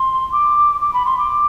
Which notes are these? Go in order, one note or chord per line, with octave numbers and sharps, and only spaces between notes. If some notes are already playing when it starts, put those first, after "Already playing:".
Already playing: C6
D6
D6
B5
C6
D6